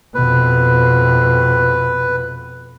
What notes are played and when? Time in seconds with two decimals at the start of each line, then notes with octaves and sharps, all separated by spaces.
0.15 F2 B2 B4